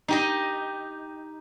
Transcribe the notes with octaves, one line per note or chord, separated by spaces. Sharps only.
D#4 G4 D#5